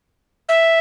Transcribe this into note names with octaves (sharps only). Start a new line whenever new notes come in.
E5